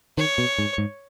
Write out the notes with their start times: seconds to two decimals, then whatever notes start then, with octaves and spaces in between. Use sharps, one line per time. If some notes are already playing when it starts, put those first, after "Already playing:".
0.18 D#3 C#5
0.38 B2
0.58 G#2
0.78 G#2